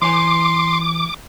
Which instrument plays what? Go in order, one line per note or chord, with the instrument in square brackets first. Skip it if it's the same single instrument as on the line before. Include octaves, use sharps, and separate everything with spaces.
[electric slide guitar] E3 C#5 G#5 [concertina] C6 [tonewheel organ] D6